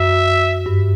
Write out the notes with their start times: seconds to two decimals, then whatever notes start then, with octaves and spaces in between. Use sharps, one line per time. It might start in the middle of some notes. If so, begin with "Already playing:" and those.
Already playing: F#2 E5
0.66 G2